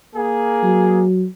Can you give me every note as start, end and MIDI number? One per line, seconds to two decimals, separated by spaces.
0.15 1.04 58
0.15 1.04 68
0.63 1.26 54